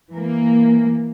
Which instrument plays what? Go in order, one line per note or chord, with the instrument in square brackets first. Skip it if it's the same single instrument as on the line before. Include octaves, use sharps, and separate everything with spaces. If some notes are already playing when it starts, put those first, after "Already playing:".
[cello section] E3 A#3